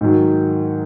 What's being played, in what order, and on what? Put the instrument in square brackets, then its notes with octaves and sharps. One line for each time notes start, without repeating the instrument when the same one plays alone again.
[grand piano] G#2 D#3 F#3